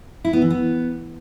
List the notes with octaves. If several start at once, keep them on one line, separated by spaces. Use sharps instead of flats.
E4
B3
E3
B3